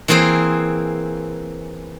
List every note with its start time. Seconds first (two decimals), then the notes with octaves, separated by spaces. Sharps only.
0.08 E3 A#3 C4 G#4 C5